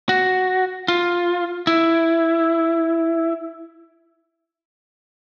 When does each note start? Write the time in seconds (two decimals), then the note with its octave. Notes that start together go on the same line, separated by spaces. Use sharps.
0.09 F#4
0.88 F4
1.67 E4